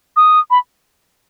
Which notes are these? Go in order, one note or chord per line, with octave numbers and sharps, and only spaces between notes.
D#6
B5